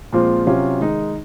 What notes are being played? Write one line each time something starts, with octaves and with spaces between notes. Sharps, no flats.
A#2 F3 G#3 C4 F4
C3 F#3 C#4 F4
D#3 G#3 D#4